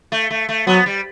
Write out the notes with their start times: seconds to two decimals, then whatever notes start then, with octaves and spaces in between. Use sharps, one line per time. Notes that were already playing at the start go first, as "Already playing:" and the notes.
0.12 A3
0.30 A3
0.49 A3
0.67 F#3 B3
0.86 G3